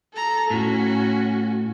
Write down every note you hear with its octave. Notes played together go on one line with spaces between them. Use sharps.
A4 A#5
A2 C#4 F#4